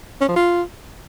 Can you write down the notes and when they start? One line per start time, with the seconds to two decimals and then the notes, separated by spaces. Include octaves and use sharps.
0.21 C#4
0.28 F3
0.36 F4